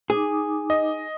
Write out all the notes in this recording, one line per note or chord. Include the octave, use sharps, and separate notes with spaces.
D#4 G#4 D6 D#6
D#5